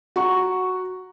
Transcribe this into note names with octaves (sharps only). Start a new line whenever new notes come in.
F#4 A#5 C#6